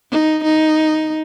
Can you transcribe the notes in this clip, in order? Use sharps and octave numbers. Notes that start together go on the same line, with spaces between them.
D#4
D#4